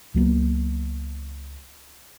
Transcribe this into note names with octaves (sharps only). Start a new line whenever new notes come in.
C#2 F#3 A#3 B3